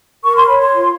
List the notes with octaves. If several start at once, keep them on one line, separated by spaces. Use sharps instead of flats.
A#4 C#6
C6
C#5 B5
C6
F4